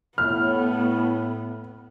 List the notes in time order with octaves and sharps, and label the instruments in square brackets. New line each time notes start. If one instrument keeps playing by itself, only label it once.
[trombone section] A2 [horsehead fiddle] B3 [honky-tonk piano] F6